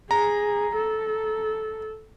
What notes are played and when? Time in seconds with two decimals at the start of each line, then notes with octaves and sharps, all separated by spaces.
0.11 G#4 A#5
0.76 A4